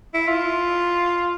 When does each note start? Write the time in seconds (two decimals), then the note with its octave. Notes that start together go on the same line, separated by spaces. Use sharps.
0.14 E4
0.28 F4